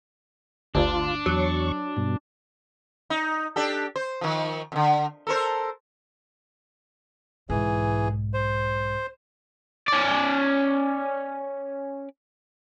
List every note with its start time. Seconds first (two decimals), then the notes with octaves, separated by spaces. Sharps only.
0.75 G1 D2 D4 F4
1.26 E2 F#3 C#6
1.97 G2 B2
3.10 D#4
3.56 D4 G4 A4
3.96 C5
4.21 D#3 F3
4.72 F2 D3
5.27 A4 A#4 C5
7.50 B1 G#2 E3 G#4
8.34 C5
9.88 C#4 D5